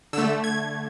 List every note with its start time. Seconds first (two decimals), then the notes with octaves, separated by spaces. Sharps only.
0.13 D3 E6
0.18 A3
0.44 G#6